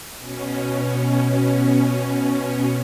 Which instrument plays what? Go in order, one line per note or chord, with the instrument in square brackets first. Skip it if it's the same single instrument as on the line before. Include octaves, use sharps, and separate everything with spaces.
[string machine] B2 C#4